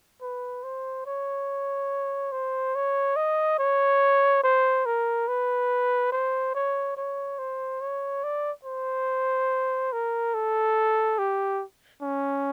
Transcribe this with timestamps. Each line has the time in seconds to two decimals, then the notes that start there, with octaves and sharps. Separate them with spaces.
0.22 B4
0.63 C5
1.06 C#5
2.32 C5
2.75 C#5
3.16 D#5
3.59 C#5
4.44 C5
4.86 A#4
5.28 B4
6.12 C5
6.55 C#5
6.97 C#5
7.39 C5
7.81 C#5
8.24 D5
8.65 C5
9.92 A#4
10.34 A4
11.19 G4
12.02 C#4